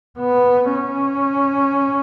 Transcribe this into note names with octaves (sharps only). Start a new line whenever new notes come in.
B3
C#4